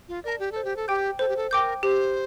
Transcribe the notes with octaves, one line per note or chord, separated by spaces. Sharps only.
F4
A#4 D5 A5
G4
A4 C5
G4
A4
G4 G5 D6 G6
A4 C5
G4
A4
A#4 G5 D6 G6
G4 C5